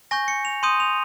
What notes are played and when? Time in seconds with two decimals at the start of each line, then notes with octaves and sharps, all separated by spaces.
0.11 G#5 C#6 G6 A#6
0.28 C#7
0.45 F7
0.63 C6 D#6 G6 D#7
0.80 F7